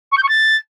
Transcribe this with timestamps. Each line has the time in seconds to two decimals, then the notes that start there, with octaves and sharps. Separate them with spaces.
0.12 C#6
0.17 G6
0.23 C#6
0.29 A6